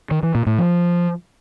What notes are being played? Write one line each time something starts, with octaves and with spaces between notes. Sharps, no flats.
D#3
E3
A#2
A2
F3